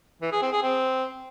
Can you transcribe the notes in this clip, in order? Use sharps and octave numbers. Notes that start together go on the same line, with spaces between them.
E3
G#4
C4
G#4
C4